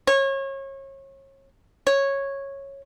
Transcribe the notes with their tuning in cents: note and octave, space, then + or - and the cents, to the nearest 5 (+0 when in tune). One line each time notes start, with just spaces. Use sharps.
C#5 -30
C#5 -10